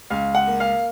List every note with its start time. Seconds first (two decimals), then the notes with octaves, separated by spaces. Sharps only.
0.10 C#2 F5
0.35 F#5
0.47 A#3
0.60 F5